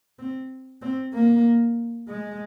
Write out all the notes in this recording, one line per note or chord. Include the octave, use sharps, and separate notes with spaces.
C4
C4
A#3
G#3